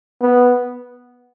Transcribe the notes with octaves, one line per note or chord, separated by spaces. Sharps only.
B3